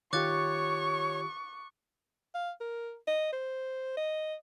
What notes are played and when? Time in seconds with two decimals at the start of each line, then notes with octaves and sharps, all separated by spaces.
0.13 D#3 F4 G4 C#5 C#6 D6 F#6 A6
2.35 F5
2.61 A#4
3.07 D#5
3.33 C5
3.97 D#5